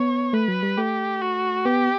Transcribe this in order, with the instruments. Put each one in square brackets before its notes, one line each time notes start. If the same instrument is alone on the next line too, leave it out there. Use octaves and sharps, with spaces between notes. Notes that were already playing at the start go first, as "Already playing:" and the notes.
Already playing: [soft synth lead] B3 [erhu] C#5
[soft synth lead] A3 [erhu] B4
[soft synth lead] F#3
G3
[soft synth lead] A3 [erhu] G4
[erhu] F#4
[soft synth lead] B3 [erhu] G4